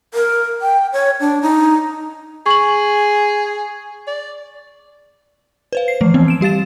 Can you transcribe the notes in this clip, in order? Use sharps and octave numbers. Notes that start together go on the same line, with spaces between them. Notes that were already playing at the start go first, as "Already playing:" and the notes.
A#4
G5
C#5
D4
D#4
G#4 C#6 F#7
D5
B4 C5 F5
C7
E3 F3 A3
E3 B3 C4
D7 E7
G3 G4 F5 A6 E7